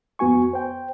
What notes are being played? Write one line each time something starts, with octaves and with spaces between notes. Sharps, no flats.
F2 B3 F#4 G#5 C#6
C5 G5